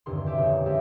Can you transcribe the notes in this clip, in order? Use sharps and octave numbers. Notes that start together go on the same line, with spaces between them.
F1 E2 G2 D3 D#3 C6
B1 G4 E5 D6
F2 A#2 C#3 E3
F3 G#3 D4 G4 A4 E5